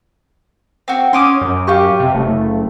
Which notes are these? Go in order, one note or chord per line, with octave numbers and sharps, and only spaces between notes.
C4 F#4
C#4 C6 D6 D#6
F#2
F4 G4 C#6
C3
F#1 A3